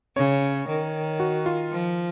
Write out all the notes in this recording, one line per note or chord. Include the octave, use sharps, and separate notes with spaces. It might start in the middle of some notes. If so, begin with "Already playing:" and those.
C#3 C#5
D#3
F#4
F4
F3